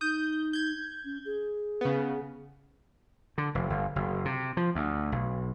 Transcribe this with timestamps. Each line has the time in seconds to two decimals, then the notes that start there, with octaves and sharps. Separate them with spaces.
0.01 D#4 D#6 G6
0.53 G6 G#6
1.05 C#4
1.25 G#4
1.81 C#3 B3
3.38 D3
3.55 F1
3.70 G1
3.96 F#1
4.25 C3
4.57 F3
4.75 D2
5.12 B1